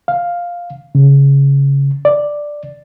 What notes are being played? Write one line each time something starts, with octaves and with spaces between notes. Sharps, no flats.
F5
C#3
D5